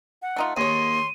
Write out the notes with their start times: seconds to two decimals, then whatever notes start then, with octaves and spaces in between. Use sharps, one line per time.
0.22 F#5
0.36 A3 D#4 F4
0.57 D#2 G#4 C#5 C6 D#7